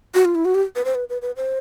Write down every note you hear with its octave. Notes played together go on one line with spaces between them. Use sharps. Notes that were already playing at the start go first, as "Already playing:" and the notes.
F#4
F4
E4
F#4
G4
B4
C5
B4
B4
B4
C5